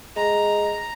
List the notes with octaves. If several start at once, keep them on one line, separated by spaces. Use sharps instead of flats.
G#3 A#5